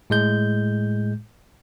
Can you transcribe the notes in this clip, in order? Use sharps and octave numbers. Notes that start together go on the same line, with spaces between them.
A2 G#3 G6